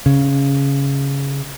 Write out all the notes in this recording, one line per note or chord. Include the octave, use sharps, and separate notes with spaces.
C#3